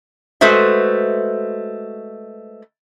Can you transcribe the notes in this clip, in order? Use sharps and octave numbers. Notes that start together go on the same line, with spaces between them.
G#3 A3 F#4 B4 C5 E5